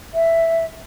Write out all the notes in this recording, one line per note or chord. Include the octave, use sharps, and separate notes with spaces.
E5